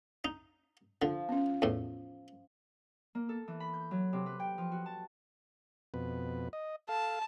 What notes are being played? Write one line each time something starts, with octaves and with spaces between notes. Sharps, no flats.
D#4
D3 F3
B3 C#4
E2 A2
A#3
A4
E3
B5
G6
F#3
C3
B4
G5
F3
F#4
A5
F2 B2 B4
D#5
A4 F5 A5